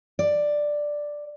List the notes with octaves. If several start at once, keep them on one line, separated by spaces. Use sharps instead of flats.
D5